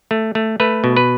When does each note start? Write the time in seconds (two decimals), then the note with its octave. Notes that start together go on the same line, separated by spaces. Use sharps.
0.11 A3
0.35 A3
0.60 A3 B4
0.84 B2
0.97 B4